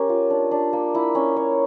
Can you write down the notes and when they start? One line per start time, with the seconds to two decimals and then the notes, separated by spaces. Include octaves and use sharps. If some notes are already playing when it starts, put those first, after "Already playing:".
Already playing: C#4 G4 A#4 C#5
0.09 F4
0.30 D4
0.51 D4
0.73 A#3
0.95 E4
1.15 C#4
1.36 C#5